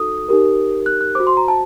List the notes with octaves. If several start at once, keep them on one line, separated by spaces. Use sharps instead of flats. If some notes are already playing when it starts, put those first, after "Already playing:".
Already playing: D#4 F#4 A4 D#6
D#4 G4 A#4
F#6
F#6
F#4 C5 D6
C6
A#5
A5